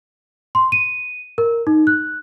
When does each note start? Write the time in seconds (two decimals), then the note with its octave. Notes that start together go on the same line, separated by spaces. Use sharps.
0.55 C6
0.72 D#7
1.38 A#4
1.67 D#4
1.87 F#6